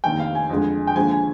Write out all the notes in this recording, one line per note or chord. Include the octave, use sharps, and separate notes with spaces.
F1 D#2 D#3 G5
F5
G#5
F2 D3 G#3
G5
D#2 D3 F3 G#3 G#5
G#5